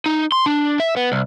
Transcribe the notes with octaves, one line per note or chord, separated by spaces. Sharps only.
D#4
C6
D4
E5
B3
C2